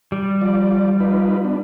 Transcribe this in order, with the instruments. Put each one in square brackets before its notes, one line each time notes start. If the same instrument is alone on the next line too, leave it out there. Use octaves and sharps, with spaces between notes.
[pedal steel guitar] G3
[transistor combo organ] F3 D5
D#4 F4 B4
B3 D4